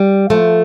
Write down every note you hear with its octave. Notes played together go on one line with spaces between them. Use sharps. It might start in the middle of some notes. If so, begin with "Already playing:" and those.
Already playing: G3
F3 A3